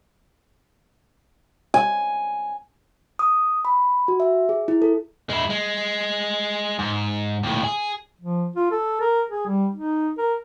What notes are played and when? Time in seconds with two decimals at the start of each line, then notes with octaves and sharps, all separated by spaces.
1.74 G#5
3.19 D#6
3.65 B5
4.08 F#4
4.20 E5
4.49 G#4
4.68 E4
4.82 A4
5.30 G#3 E4
5.50 G#3
6.79 G#2
7.43 D#2 A2
7.64 G#4
8.21 F3
8.56 F4
8.71 A4
9.01 A#4
9.30 G#4
9.47 G3
9.75 D#4
10.18 A#4